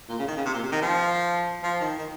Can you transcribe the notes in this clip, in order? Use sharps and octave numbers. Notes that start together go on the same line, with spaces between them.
A#2
C#3
D#3
C#3
C3
A#2
C3
D#3
F3
F3
D#3
D#3